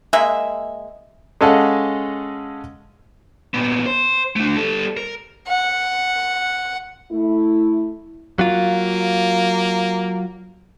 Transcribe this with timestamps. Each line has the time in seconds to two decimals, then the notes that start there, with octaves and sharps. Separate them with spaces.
0.13 G#3 A#3 E5
1.41 G#3 C#4 A4 D#5 F5 F#5
3.54 A#2 B3
3.86 C5
4.36 A3 D4
4.56 G3 A4
4.97 A#4
5.48 F#5
7.11 A3 E4
8.39 F#3 A#3 F4